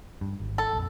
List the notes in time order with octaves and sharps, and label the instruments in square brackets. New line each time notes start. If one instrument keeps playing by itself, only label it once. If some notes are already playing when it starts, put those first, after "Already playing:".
[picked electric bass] G2
G#1
[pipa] A4
[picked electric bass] A#1 F2